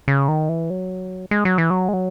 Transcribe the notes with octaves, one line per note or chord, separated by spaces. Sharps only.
C#3
D#3
E3
F#3
G#3
F#3
E3
F#3
G#3
F#3